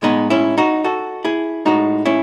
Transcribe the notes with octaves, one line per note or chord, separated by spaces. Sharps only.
A2 G#3 B3 D#4
C#4 E4
D#4 F#4
F#4 A4
E4 G#4
A2 G#3 D#4 F#4
C#4 E4